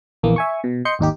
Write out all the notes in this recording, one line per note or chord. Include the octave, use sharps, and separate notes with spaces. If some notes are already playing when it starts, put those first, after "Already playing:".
A#1 E2 E3 A#3
E5 G#5 C#6
B2
D#5 C6 G6 C#7
G#1 D#2 D#4 G4